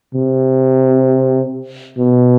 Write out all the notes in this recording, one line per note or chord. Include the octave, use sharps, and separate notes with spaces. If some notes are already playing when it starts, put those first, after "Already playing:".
C3
B2